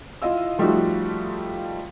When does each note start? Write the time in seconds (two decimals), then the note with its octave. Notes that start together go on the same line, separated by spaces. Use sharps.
0.22 E4 F4 D#5 F5 E6
0.59 F3 G3 A3 D#4 F4 F#4